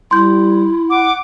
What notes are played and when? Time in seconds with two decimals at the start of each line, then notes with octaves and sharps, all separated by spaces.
0.11 G3 E4 C6 G6
0.90 F#5 D6